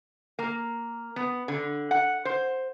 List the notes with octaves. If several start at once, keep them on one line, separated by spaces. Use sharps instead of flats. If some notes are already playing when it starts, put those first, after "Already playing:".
A#3
B3
D3
F#5
C5